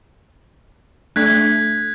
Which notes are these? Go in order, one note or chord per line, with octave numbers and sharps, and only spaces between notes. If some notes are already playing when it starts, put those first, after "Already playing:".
A3 D4 F#6 G#6 B6